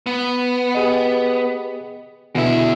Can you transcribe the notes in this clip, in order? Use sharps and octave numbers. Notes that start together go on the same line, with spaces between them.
B3
G4 G#4 D#5
E2 B2 D3 E4 E5